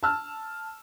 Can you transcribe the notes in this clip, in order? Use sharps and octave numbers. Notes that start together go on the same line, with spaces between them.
A5 E6 F6